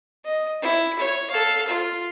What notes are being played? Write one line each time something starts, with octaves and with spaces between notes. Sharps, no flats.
D#5
E4
C#5
A4 F5
F4